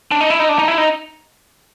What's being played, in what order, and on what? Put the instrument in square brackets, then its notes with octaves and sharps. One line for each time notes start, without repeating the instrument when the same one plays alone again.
[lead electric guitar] D4
D#4
E4
D#4
D4
D#4
E4
D#4